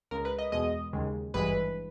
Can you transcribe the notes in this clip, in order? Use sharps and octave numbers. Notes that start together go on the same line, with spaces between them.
C#2 C#3 G#3 A#4
B4
D#5
E2 B2 G#3 D#5
D#2 C#3 G#3
G#1 G2 E3 G#3 B4